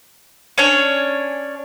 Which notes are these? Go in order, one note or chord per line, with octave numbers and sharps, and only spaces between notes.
C#4 D4 C#5